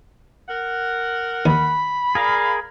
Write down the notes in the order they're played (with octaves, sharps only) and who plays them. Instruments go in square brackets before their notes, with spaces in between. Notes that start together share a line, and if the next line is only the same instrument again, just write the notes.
[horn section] A#4 F#5
[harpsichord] D#2 [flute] B5
[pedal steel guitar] G#4 A#4 [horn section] D5 F5